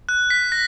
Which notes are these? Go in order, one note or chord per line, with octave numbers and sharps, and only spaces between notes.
F#6
B6
A#6